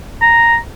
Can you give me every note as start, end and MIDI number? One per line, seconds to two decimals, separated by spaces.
0.21 0.57 82